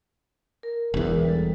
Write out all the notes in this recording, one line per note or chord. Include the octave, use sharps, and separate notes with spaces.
A#4
E1 E2
G3 A4